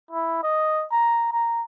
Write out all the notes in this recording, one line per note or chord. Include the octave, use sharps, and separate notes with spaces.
E4
D#5
A#5
A#5